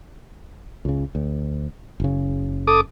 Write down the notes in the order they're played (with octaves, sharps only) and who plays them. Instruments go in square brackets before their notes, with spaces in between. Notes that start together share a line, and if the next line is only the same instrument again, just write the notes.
[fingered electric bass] C#2 C#3
D2
F#1 C#3
[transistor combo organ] A4 D6 D#6